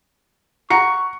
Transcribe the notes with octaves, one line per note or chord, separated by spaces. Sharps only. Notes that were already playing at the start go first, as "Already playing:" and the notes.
F#5 A#5 C#6 C#7